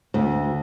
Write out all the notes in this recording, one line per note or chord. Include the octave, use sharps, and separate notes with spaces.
D2